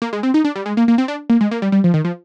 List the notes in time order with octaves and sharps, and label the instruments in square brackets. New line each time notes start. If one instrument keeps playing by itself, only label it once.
[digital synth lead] A#3
G#3
C4
D#4
D4
G3
G#3
A#3
A#3
C4
D4
A#3
G#3
A#3
G3
G3
F3
D#3
F3